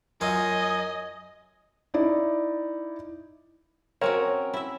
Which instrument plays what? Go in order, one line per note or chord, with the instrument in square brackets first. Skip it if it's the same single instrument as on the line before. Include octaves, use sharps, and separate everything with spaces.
[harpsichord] F#2 F#3 F4 [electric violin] D#5 [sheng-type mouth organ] G#5
[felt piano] D#4 E4 D5
[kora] C4 C#4 F#4 [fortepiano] A#4 C#5
[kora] E4 E5